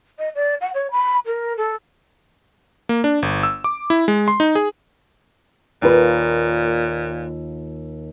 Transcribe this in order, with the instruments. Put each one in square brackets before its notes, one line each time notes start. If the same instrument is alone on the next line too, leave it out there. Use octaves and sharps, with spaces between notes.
[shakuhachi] D#5
D5
F#5
C#5
B5
A#4
A4
[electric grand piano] A#3
D4
G1
E6
D6
E4
G#3
C6
D#4
G#4
[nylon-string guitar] D#2 F4 B4 [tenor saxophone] A#2